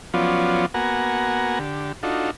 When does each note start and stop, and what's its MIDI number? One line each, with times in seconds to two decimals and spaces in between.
0.14 0.66 53
0.14 0.66 54
0.14 0.66 59
0.14 0.66 61
0.14 0.66 65
0.14 0.66 74
0.74 1.59 58
0.74 1.59 59
0.74 1.59 66
0.74 1.59 78
0.74 1.59 80
0.74 1.59 82
1.59 1.92 50
1.59 1.92 67
2.03 2.31 62
2.03 2.31 63
2.03 2.31 65
2.03 2.31 66
2.03 2.31 69